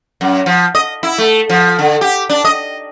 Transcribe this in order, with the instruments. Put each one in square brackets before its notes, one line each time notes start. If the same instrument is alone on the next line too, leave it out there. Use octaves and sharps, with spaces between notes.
[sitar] F#2
F3
D#5
E4
A3
F3
D3
G4
D4
D#5